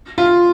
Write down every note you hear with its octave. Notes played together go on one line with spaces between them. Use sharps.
F4